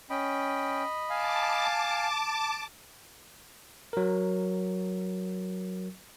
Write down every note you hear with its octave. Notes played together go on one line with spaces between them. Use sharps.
C#4 D#5 G5 B5
F5 G#5 A5 D6
F#3 A#4